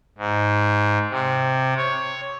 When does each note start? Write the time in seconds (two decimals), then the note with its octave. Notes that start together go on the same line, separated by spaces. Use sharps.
0.18 G#2
1.10 C3
1.77 C#5